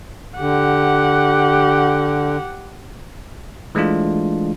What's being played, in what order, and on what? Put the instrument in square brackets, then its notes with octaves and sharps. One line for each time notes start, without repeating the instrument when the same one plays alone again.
[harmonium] D3 [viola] G4 F#5
[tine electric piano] E3 G#3 A3 D4 F4